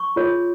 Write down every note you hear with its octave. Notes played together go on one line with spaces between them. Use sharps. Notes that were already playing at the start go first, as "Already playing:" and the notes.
Already playing: C#6
F4 G#4 C#5